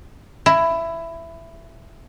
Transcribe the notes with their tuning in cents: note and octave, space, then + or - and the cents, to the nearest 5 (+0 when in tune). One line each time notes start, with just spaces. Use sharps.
E4 +15